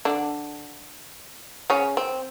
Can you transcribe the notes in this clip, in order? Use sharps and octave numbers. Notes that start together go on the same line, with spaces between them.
D3 D4
C#3 C#4
C4